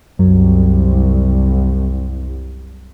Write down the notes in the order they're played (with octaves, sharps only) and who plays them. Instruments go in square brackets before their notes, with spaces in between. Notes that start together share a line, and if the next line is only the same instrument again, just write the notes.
[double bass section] C2 [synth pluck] F#2 F#3